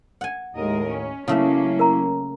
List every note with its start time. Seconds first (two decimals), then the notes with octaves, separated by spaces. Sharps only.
0.21 F#5 G#5
0.55 D#2 A2 G#3 A#4 D#5
0.88 C#4
1.28 C#3 F#3 A3 A#3 C#4 E4 E5
1.79 A#4 A#5